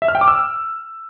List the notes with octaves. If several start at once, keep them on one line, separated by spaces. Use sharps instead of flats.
E5
F6
G5
D6
E6